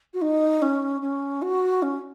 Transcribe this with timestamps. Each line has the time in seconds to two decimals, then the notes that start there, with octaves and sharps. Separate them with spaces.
0.14 F#4
0.21 D#4
0.62 C#4
1.01 C#4
1.42 F#4
1.82 C#4